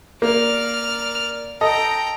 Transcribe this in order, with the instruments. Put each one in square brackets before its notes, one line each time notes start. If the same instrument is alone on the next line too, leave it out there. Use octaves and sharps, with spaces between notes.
[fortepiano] A#3 [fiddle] D5 F6
[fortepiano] A4 D#5 [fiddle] G5 A#5